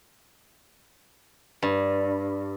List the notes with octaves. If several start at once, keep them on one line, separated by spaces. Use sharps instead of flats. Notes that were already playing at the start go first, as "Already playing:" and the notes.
G2